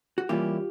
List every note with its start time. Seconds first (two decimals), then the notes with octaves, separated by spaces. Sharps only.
0.18 F#4
0.29 E3 G3 A#3 C#4 E4 F4 G4